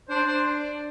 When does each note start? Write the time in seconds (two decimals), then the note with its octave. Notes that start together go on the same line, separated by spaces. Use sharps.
0.09 D4 C5
0.27 C5